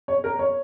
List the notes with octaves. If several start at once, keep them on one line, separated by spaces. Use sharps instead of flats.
C#5
A#4
C#5